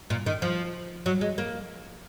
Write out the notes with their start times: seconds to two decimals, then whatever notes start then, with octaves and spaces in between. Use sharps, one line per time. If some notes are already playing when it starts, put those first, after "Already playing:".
0.10 A#2
0.26 D#3
0.42 F3
1.06 F#3
1.21 G#3
1.38 A#3